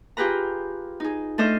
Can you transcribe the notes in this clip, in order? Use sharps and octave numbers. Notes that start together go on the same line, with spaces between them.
F4 G4 G#4 B4 A#5
D#4 G#4
A3 D4 A4 C5 D#5 F6